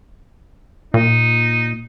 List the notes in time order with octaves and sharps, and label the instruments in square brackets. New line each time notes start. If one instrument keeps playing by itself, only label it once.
[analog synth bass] A#2 [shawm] D#4